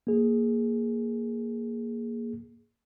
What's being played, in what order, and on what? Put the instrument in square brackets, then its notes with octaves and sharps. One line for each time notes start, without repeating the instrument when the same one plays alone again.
[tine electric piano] A#3 G#4